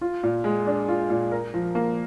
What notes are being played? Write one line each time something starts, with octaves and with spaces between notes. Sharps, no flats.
F4
A#2
G#3
D4
F4
A#2
A#4
F3
A#3